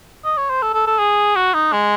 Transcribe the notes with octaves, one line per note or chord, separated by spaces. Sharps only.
D#5
C#5
C5
A4
A4
A4
G#4
F#4
D#4
G#3